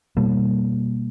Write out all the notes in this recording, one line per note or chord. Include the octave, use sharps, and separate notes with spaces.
B2 G3 A#3